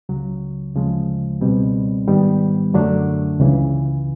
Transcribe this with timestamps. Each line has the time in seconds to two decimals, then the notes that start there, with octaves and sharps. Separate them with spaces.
0.09 C#2 C#3 F#3
0.75 D2 C#3 F3 G#3
1.41 C#2 B2 G3 C4
2.07 G#2 D#3 G3 B3
2.74 F#2 D3 F#3 A3 D4
3.40 C#2 C#3 E3